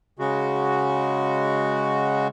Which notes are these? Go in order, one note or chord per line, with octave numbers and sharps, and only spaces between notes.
C#3 G#3 F#4